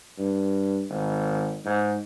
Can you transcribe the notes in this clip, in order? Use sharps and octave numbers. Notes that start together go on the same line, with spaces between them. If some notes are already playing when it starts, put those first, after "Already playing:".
G2
G#1
G#2